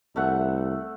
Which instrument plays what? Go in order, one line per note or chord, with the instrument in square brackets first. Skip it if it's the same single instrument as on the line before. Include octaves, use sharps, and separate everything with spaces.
[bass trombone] C2 [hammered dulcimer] A3 E5 F#5